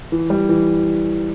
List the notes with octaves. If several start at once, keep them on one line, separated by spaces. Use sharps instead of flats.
E3
G3
E3